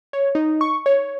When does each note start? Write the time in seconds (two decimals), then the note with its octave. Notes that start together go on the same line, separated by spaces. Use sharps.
0.13 C#5
0.35 D#4
0.61 C#6
0.86 C#5